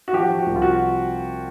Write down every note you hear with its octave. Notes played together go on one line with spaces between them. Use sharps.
F#4
F3 G4
F3
F#4
C2
F4
F#4